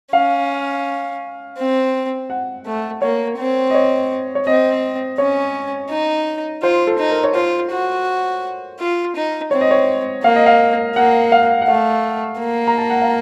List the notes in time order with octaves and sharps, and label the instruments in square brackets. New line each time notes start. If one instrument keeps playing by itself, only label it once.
[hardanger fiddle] C#4 [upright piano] F5
[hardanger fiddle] C4
[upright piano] F#5
[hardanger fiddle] A3
[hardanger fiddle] A#3 [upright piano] C#5
[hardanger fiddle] C4
[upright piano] D#5
C#5
C#5
[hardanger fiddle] C4 [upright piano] D#5
[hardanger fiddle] C#4 [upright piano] C#5
[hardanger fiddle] D#4
[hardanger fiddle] F4 [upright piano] C5
[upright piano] A4
[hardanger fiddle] D#4
[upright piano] A#4
C#5
[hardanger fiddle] F4 [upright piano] C5
[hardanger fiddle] F#4
F4
D#4
[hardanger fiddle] C4 [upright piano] C#5
[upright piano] D#5
C#5
[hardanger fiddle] A#3 [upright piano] F5
[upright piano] D#5
F5
[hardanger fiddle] A#3 [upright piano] F#5
[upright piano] F5
F#5
[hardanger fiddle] A3 [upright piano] F5
[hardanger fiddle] A#3
[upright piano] A#5
A5
F#5
F5